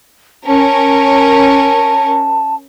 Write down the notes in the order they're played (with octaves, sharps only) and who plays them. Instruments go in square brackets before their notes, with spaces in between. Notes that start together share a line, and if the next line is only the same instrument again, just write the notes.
[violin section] C#4 A#4 [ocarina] A5